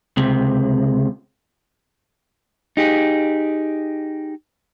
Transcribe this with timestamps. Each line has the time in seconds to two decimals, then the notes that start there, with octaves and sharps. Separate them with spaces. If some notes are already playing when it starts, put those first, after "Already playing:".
0.17 C#2 C3
2.77 D#4 G4 G#4